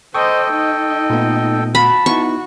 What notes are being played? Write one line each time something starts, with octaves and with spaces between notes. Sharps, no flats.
A4 C5 D#5 G5 C#6 D#6
D#4 D#5
A#2 A3 B3
F#4 A5 B5
B3 D#4 E4 F#4 C#6